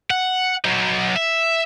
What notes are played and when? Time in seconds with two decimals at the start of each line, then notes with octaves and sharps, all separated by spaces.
0.10 F#5
0.65 F#3 D#4
1.15 E5